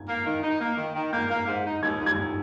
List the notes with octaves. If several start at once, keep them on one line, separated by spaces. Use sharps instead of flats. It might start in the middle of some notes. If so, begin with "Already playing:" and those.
Already playing: G#6
A#3
D#3
D#4
A#3
D#3
D#3
A#3 G6
A#3
G#2
D#4
D#2 G#6
D#2
G#6
D#2